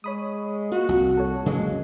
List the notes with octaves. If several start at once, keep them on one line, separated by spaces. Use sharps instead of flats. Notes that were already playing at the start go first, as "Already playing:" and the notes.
G#3 C#5 B5 D#6
A#3 F4 F#4
C2
A4 C#5
C#3 E3 F#3 G#3 A#3